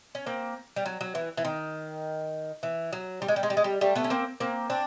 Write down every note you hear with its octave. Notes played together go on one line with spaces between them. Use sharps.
C#4
A#3 C4
G3
F#3
F#3
E3
E3
D#3
E3
F#3
G3
G#3
G3
G#3
G3
G#3
G3
G3 A3
A3 B3
C#4
A#3 C4
A#3 C4
C4 D4